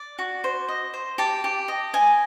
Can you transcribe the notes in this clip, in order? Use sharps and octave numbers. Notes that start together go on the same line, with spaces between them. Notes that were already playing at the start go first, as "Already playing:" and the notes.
Already playing: D5
F#4
C5
D#5
C5
G4 A5
G4
D#5
D#5 G#5